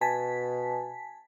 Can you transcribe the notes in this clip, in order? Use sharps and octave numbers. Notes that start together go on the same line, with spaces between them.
B2 G#5 A5 B6